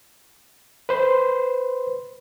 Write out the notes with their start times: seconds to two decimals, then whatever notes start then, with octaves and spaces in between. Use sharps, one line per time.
0.89 B4 C5 C6